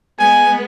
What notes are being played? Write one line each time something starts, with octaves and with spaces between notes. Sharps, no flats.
G#3 B3 G#5